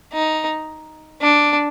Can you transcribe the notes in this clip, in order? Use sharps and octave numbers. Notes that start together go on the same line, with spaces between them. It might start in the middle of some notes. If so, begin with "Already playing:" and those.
D#4
D4